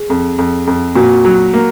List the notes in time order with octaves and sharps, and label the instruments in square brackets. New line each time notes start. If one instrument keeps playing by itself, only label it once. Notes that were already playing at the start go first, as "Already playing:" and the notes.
Already playing: [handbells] G#4
[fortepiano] F2
F2
F2
[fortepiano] A#2 [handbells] F#4
[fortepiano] F#3
A#3